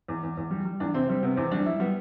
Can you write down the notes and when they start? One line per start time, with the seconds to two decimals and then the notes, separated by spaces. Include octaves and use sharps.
0.08 E2
0.23 E2
0.37 E2
0.51 G3
0.65 G3
0.80 E2 D4
0.94 C3 C4
1.08 G3 C4
1.23 C3 B3
1.37 E2 C4
1.51 G3 D4
1.66 G3 E4
1.80 G3 B3